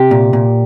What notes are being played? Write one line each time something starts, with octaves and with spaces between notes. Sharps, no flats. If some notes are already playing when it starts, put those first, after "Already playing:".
Already playing: C3 G4
A#2
A#2